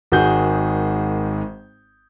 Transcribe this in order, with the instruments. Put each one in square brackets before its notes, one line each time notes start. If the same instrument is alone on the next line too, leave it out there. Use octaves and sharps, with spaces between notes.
[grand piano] G#1 D#3 G#3 F#4 G#4 G6